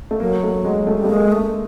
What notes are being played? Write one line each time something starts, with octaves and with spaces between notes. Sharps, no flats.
A3
F#3 A#3
A3
G#3
A3
G3
A3
G#3 A#3
A3